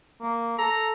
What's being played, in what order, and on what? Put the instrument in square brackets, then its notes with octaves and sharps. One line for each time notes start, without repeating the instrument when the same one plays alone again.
[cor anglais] A#3
[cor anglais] A4 [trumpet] A#5